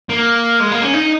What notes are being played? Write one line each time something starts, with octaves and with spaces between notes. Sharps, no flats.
A#3
G#3
A#3
C#4
D#4